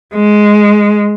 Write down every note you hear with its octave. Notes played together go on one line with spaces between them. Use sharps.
G#3